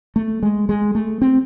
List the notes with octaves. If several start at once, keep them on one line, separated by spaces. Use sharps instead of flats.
A3
G#3
G#3
A3
C4